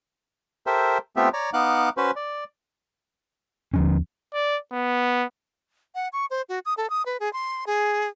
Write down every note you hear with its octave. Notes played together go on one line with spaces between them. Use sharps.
G4 A4 A#4 C5 E5
A3 B3 C4 F4 G4 E5
C#5 D5 A#5
B3 D#4 F5 F#5 D6 F#6
C#4 F#4 B4 C5
D5
D#2 D3 F3 C#4
D5
B3
F#5
C#6
C5
F#4
D#6
A4
D#6
B4
G#4
C6
G#4